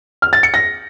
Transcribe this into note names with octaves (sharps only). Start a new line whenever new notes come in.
F6
A6
C#7
A#6